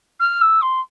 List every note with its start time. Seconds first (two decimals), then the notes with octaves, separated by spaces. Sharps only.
0.20 F6
0.41 E6
0.62 C6